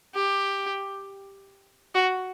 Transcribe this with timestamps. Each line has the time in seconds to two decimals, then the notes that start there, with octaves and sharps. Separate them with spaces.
0.15 G4
1.95 F#4